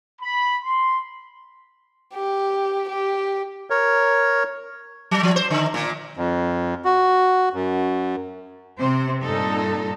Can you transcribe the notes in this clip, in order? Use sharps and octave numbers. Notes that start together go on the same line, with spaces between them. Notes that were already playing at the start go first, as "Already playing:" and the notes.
B5
C6
G4
G4
A#4 C#5
F#3
F3
C5
D3
A#2
F2
F#4
F#2
C3 C5
G2 A#2 D#4 A4